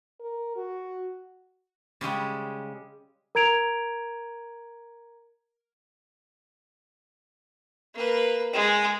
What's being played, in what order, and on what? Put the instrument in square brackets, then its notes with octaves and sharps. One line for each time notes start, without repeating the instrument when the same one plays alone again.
[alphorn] A#4
F#4
[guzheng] C#3 G3 G#3 G4
[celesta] A#4 A#5 G#6 D7 F7
[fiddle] A#3 B4
G#3